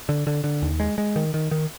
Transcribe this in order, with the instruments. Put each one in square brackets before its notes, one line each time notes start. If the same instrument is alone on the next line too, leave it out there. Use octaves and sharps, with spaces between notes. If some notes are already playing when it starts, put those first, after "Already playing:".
[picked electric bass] D3
D3
D3
D#2
G#3
G#3
D#3
D#3
D#3